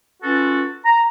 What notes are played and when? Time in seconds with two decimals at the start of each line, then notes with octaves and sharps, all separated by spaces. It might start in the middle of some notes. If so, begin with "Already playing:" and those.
0.23 C#4 F4 F#4 A4 B4
0.85 A#5